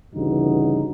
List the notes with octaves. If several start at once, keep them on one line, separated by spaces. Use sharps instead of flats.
D2 G2 C#3 E3 D#4 F#4